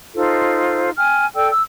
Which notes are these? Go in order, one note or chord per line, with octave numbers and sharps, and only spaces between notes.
D#4 F4 A4 C5
G5 G#5 F6
A4 D5 G5 E6
E6